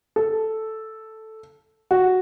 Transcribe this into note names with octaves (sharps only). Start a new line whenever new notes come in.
A4
F#4